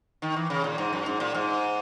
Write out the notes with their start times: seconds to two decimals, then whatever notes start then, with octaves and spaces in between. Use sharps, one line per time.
0.22 D#3
0.36 E3
0.50 C#3
0.64 A#2
0.78 G#2
0.93 F#2
1.06 G#2
1.20 A#2
1.35 G#2